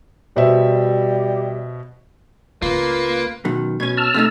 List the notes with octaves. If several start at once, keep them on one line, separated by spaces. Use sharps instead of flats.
B2 G3 C5 E5
C#2 A#3 C#4 F4 B4
F#2 B2 D#3
B2 C#4 G#6
A5 E6 F6
C3 A3 D#4